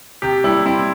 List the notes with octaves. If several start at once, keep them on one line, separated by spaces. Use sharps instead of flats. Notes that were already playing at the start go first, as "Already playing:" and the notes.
C3 G4
G3 E4
C4 E4